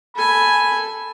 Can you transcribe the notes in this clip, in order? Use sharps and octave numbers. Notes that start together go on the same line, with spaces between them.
A4 G#5 B5